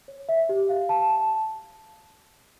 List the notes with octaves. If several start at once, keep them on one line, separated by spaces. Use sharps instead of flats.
C#5
E5
G4
F5
A5
A5